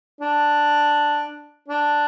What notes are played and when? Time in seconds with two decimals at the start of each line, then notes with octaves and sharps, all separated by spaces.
0.21 D4
1.69 D4